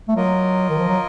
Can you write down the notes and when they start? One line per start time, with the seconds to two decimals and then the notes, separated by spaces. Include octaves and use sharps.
0.08 A3
0.16 F#3 A#3 F4 A#4 D#5
0.69 D#3
0.78 F3
0.88 F#3